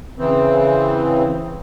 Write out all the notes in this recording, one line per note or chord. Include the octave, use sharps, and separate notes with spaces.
C#3 E3 C4